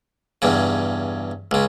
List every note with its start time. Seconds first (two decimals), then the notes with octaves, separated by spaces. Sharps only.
0.42 E2 G2 C#3
1.51 C#2 C#3